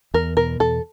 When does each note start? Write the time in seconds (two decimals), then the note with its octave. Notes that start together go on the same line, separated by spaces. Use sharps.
0.14 E2 A#4
0.37 B2 A#4
0.60 E2 A4